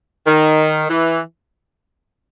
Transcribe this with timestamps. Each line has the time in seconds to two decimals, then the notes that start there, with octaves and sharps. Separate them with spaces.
0.26 D#3
0.90 E3